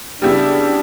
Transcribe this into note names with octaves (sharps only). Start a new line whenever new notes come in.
C#3 G3 B3 D4 E4 G4